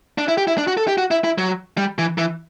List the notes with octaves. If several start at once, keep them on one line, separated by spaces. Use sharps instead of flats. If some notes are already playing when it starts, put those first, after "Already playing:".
D4
E4
G4
E4
D4
F#4
A4
G4
F#4
E4
E4
F#3
G3
E3
E3